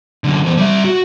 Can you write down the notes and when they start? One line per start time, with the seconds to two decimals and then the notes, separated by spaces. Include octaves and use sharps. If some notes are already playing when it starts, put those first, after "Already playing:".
0.24 F#2 D3
0.44 E2 C5
0.57 G3 E5
0.84 F#4